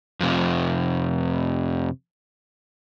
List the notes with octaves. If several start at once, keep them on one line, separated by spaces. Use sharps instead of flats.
F2 C3